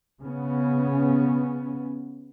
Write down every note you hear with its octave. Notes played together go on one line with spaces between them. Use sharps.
C#3 B3 C#4